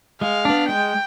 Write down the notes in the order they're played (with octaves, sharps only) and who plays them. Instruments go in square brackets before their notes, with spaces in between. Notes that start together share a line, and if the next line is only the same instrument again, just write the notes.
[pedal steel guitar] G#3 [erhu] F5
[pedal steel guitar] B3 D4
[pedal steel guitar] G#3 [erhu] G5